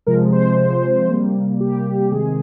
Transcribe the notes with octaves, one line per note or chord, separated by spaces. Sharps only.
C3 F3 G#3 A#4
C5
C3 F3 G#3
C3 G3 A#3
C3 G3 A#3 G4
C3 D#3 G#3 G#4